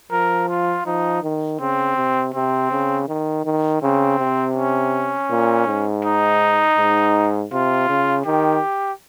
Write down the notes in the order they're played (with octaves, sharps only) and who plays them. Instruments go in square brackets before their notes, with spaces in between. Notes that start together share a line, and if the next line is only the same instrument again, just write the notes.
[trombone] F3 [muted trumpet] A#4
[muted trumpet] F4
[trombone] F3 [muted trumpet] D#4
[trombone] D#3
[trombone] C#3 [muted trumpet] C4
[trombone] C3
[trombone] C3 [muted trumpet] C4
[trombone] C#3
D#3
D#3
[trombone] C#3 [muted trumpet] C4
[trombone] C3
[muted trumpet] C#4
[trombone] A#2
G#2
[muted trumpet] D#4
[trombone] G#2
[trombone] C3 [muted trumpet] F4
[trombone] C#3
[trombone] D#3 [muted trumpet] G4